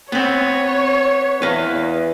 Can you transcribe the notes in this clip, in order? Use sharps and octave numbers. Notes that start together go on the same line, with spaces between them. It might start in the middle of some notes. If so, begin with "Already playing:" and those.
B3 C4 C#5
E2 B4 F5